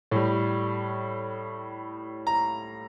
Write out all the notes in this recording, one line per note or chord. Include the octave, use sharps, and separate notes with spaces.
A2 G3
A#5